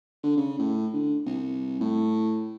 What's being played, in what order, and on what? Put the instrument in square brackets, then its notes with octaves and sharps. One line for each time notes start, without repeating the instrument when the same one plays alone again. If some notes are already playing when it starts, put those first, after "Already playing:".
[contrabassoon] D3
C#3
A2
D3
C2
A2